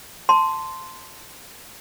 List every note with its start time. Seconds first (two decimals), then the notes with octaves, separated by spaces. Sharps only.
0.29 A5 C6